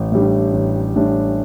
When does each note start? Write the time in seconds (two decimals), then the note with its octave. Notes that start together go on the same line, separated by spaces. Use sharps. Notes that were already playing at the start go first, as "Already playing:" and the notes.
Already playing: A1
0.12 A2 G3 D4
0.53 A1
0.95 A2 G3 D4